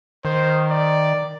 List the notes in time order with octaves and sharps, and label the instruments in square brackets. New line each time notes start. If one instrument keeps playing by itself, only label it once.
[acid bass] D#3 [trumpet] C5
[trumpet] D5